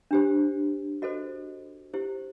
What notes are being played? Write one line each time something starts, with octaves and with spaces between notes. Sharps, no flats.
D4 G4 C5
F#4 A4 C5 D#5
E4 G4 C5